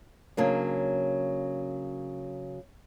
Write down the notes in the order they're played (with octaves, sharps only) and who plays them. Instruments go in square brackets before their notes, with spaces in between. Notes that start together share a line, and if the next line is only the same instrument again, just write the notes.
[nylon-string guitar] C#3 F#3 A#3 D4